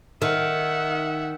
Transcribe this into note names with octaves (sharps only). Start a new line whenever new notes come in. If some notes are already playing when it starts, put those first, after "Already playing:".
D#3 E5 F#5